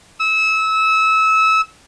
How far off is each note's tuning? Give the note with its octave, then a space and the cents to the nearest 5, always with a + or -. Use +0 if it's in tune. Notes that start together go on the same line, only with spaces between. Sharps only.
E6 -25